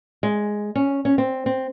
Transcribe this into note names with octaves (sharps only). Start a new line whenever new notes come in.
G#3
C#4
C#4
C4
C4